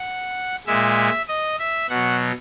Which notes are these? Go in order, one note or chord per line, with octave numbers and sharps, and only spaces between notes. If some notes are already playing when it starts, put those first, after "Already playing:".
Already playing: F#5
A#2 G#3 E5
D#5
E5
B2 F#3 F#5